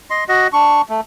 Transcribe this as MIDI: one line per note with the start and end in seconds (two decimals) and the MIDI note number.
0.10 0.24 75
0.10 0.24 84
0.29 0.48 66
0.29 0.48 75
0.53 0.82 62
0.53 0.82 85
0.89 1.01 57